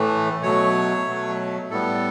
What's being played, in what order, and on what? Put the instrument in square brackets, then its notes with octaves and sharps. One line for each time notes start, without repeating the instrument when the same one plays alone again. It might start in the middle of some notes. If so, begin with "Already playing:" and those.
Already playing: [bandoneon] A2 E3 A3
B2 F#3 A3 C#5
B2 F#3 A3
A2 G3 B3 A4